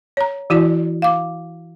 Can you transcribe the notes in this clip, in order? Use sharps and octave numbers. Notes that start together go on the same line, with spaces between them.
C#5 A#5
E3 E4 F#4 D5
F5 D6